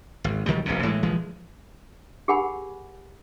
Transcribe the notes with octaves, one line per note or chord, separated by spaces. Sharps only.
G#1
A#1 D#3 F#3 G3
F1 A#1 G2 C3
A2 E3 G#3
A#1 E3 F3 G#3
G4 G#4 A#4 F#5 G#5 B5